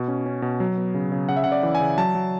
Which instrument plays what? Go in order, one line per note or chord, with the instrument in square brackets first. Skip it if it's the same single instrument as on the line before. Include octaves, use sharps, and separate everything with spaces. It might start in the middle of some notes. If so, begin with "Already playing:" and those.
Already playing: [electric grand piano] B2
C#4
C#4
B2
F#3
B3
C#3
C#3
C#3 F#5
E5
C#3 F#5
D5
E3
G#5
C#3
F#3 A5
F#3